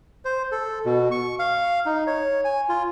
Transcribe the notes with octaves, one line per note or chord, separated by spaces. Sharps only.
C5
A4
B2
C#6
F5
D#4
C#5
G#5
F4